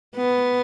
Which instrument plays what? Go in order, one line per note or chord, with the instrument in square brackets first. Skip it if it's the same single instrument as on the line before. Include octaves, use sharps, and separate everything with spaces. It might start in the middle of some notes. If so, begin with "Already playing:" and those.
[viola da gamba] B3